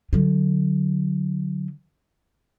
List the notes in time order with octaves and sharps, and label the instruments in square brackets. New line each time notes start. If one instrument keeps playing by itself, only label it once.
[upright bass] D3 F#3